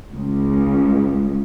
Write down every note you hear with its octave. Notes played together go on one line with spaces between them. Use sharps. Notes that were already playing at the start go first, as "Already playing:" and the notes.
C#2